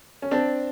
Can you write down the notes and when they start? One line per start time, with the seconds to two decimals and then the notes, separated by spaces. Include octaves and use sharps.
0.22 C#4
0.31 C4 D4